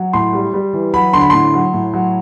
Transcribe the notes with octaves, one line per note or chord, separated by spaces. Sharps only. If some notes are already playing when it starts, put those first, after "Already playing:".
Already playing: F#3
A2 C6
G3
G3
E3
F#3 B5
D3 C6
B5
A2 C6
F#3
A2
F#3